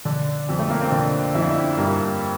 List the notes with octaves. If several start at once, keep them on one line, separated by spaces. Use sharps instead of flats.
D3 D4
F2
A3
A#3
C4
D3 D4
F2 E4
D4
E4
G2 A#3